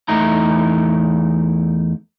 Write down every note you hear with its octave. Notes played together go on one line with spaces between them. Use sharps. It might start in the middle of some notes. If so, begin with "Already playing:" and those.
E2 E3 A3 D#4 E4 A#5